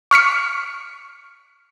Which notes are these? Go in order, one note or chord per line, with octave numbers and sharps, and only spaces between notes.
C#6 F6 B6 C#7